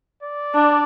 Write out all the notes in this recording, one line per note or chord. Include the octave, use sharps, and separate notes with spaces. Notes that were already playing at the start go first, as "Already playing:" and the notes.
D5
D4